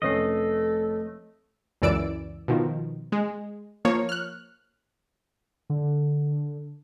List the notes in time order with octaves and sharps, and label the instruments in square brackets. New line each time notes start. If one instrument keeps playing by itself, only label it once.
[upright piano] F1 C#4 C7 [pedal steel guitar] A3 D#5 [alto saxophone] A4
[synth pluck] C#2 F#2 E3 D5 E6 D7
B2 D#3 F3
G#3
F3 A#3 C#5
F6 F#6
[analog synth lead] D3